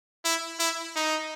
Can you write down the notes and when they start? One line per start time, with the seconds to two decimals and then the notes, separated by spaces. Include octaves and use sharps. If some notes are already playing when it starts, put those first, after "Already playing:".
0.25 E4
0.59 E4
0.96 D#4